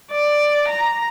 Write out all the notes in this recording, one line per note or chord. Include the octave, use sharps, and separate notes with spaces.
D5
A#5